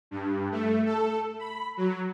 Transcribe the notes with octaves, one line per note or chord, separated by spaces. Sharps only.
G2
A3
A4
B5
F#3